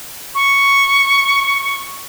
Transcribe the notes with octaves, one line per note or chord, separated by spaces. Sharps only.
C#6